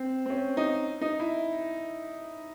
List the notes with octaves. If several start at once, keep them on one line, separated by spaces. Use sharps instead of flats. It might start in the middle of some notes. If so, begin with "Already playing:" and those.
Already playing: C4
C4
C#4
D#4
D#4
E4